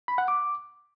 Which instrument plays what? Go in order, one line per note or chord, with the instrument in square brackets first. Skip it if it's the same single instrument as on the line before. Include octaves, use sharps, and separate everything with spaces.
[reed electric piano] B5
F#5
D6